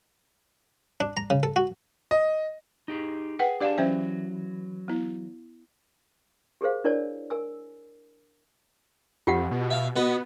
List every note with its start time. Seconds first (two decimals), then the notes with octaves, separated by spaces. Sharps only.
1.00 D4
1.17 A#5
1.30 C#3
1.43 A4
1.56 F#4
2.11 D#5
2.88 D#4 G4 G#4
3.39 G#4 B4 F#5 G5
3.60 D4 G4 G#4 D5 F5 A5
3.78 E3 F#3 C#4 C5 E5
4.88 B3 E4
6.61 G4 G#4 A#4 C5 F5
6.84 D4 E4 A#4 C#5 D5 A5
7.30 A#4 G#5 E6
9.27 F2 F4 G4 F#5
9.51 B2
9.70 E5 F5
9.96 B2 B3 B4 D#5